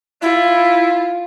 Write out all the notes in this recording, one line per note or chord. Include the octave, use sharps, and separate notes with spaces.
E4 F4